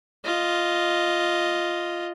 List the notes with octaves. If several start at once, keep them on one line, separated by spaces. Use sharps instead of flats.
F4 D#5